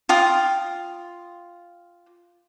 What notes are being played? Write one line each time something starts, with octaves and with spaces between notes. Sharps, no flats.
F4 G5 D#6